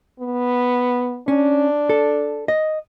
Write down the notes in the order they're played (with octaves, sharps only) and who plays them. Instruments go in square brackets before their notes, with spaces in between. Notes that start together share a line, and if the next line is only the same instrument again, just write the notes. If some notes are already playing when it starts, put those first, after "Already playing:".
[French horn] B3
[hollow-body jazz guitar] C#4 [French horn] D4
[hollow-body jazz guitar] A4
D#5